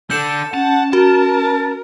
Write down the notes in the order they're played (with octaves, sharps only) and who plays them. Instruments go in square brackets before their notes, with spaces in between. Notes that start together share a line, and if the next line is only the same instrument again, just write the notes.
[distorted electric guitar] D3 [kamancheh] A4 [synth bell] G6 C#7 E7
[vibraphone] C#4 [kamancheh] F#5 [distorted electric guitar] A5
[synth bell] F#4 [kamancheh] A#4